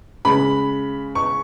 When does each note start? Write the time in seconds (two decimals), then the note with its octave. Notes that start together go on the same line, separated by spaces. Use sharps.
0.25 C#3 G#3 B5
1.15 C#6